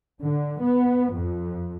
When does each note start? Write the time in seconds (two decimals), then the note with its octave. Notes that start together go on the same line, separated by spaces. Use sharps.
0.21 D3
0.60 B3
1.12 F2